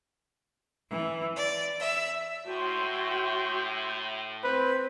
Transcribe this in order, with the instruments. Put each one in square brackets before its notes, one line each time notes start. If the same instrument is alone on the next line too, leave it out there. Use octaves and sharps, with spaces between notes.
[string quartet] E3
D5
E5
[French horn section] A2 [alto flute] F#4 [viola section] E5 G5 C6
[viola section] C4 [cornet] B4 [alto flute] C5